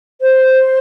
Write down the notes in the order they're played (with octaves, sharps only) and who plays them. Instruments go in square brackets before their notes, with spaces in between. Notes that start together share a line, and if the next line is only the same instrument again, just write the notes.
[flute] C5